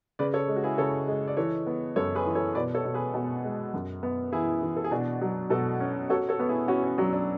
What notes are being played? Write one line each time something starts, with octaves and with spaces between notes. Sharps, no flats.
C#3 B4 D5
A4 C#5
G#3
F#4
E4 G#4
C#3 A4 C#5
G#3
D5
E3 A4 C#5
B3
F#2 A4 C#5
G#4 B4
E3
A4 C#5
B2 B4 D5
A4 C#5
B2
G#4 B4
B2
G#3
F#2
B3
E3 E4 G#4
E3
A4
G#4
B2 D4 F#4
F#3
B2 F#4 A4
C#4
F#4 A4 C#5
A4 C#5
B3
E4 G#4
C#4 E4 F#4
C#4
F#3 D4
D4